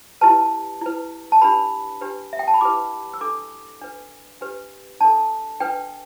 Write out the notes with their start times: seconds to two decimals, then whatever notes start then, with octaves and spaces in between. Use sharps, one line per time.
0.21 E4 G4 B4 A5
0.81 E4 B4
1.32 A5
1.41 D4 G4 B4 B5
2.01 D4 G4 B4
2.33 E5
2.39 G5
2.48 A5
2.54 B5
2.61 E4 G4 B4 D6
3.14 E6
3.21 D4 A4 D6
3.81 D4 B4
4.41 D4 G4 B4
5.01 D4 A4 A5
5.60 D4 B4 G5